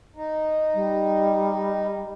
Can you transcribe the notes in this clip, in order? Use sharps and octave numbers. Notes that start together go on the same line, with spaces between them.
D#4
G3